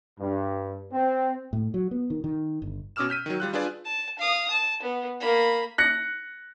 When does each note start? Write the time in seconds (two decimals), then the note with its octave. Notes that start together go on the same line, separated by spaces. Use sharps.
0.20 G2
0.92 C4
1.53 A2
1.74 F#3
1.91 B3
2.10 D#3
2.24 D#3
2.62 G1
2.96 B2 C#4 D6 E6 F6 E7
3.09 F6 G6 B6 D#7
3.26 D#3 F#3
3.40 G3 F4 F#6
3.53 D4 F4 G#4 B4 D5 G#5
3.85 A5
4.19 F5 D#6
4.51 A5
4.82 B3
5.20 A#3 B5
5.78 F#6 A#6 C#7